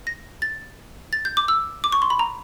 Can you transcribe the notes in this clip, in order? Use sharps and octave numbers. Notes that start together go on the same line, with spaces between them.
A#6
A6
A6
G6
D6
E6
D6
C#6
C6
B5
A#5